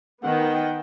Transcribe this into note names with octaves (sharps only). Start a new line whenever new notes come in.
D#3 B3 F#5 G5